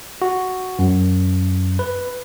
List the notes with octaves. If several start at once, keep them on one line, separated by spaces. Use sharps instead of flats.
F#4
F#2
B4